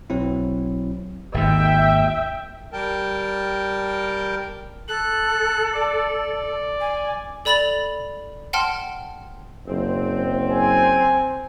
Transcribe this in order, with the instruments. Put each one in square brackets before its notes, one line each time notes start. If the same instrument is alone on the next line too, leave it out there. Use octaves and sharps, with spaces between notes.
[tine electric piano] B1 F#3 C4 E4
[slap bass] G#1 D#2 [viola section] E5 G5
[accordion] G3 A#4 G5 A5
[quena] A4 [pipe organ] F#6
[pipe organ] D5
[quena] G#5
[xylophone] A4 D5 B5 A6 F7 F#7
F#5 G5 A5 C6 F6
[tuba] F#1 [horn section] C4
[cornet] G#5